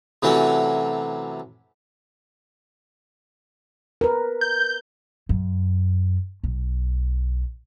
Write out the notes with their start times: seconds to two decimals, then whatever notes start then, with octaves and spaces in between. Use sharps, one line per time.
0.22 C3 E3 F#3 A3 C#4
4.01 A#4 B4
4.41 G6
5.29 F#2
6.44 B1